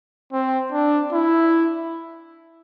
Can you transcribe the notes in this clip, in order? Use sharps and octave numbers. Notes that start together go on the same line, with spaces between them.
C4
D4
E4